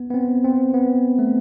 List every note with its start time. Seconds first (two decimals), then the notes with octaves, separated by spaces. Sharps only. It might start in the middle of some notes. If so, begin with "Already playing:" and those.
Already playing: B3
0.10 B3
0.14 C4
0.45 C4
0.74 B3
1.19 A3